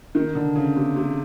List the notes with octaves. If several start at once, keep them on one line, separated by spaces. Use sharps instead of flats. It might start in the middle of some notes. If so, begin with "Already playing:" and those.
D#3
D3
C#3
C3
C3